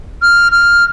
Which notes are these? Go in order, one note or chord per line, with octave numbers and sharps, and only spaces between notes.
F6
F6